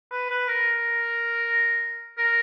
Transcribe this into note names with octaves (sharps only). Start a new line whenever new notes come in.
B4
B4
A#4
A#4